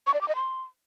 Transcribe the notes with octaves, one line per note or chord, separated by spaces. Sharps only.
C#6
D5
D6
D#5
C6